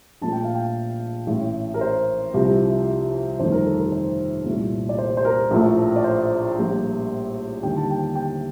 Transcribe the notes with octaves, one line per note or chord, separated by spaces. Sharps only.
A#1 A#2 F3 A3 A5
G5
F5
G5
A1 A2 A3
A#4
C5
C2 C3 F3
G1 F2 D#3 A3 C5
A#4
A4
A#4
C5
C2 A#2 A3
D5
C5
C5
A#4
A#1 A2 F3 A3
D5
C5
A#1 A2 G3 A#3
D#2 D3 G3 A#3 G5
A5
G5
G5